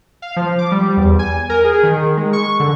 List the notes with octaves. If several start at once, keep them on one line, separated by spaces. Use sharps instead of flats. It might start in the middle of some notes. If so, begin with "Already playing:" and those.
F5
F3
D6
G3
E2
G#5
A#4
G#4
D#3
G#3
C#6
D3